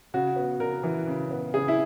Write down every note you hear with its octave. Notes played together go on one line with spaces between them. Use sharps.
C#3 F#4
B3
C#3 A#4
E3
C#3
B3
C#3 G#4
E4